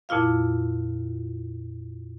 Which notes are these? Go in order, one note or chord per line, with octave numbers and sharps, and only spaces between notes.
F2 A#2 E4 F4 F5